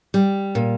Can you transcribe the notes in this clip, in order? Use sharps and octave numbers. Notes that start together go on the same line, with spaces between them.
G3
A#2